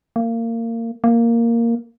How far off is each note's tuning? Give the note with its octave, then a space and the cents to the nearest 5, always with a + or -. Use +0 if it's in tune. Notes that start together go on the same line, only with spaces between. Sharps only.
A#3 -25
A#3 -5